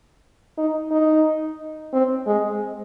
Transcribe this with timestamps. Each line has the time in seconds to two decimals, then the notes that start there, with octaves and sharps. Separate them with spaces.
0.58 D#4
0.91 D#4
1.93 C4
2.26 G#3